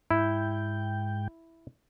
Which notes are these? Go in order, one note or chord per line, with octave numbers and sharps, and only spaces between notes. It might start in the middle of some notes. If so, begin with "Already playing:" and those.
G#2 E4 G5